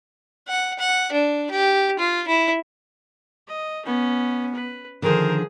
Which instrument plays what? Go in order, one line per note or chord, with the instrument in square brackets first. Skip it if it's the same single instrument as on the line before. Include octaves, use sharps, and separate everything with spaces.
[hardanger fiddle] F#5
F#5
D4
G4
F4
E4
[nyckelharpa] D#5
[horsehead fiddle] B3 [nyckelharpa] C#4
[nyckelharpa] B4
[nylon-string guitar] D3 D#3 F3 [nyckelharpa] G#4 [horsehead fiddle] A#4 C5